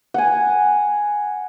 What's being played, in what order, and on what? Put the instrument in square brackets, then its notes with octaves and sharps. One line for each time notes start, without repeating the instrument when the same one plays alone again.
[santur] F#5 G#5